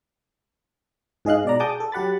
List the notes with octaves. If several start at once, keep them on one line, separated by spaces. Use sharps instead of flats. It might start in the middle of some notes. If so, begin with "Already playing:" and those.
G#2 G#4 D#5 F5 F#6
B2 D5 A#5
G#4 F#5 A5 D6 D#6 G6
A4
F#3 G4 F#5 B5 A6